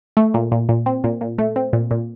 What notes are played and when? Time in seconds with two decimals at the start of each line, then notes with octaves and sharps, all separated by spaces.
0.17 A3
0.34 A#2
0.52 A#2
0.69 A#2
0.86 C4
1.04 A#2
1.21 A#2
1.39 A3
1.56 C4
1.73 A#2
1.91 A#2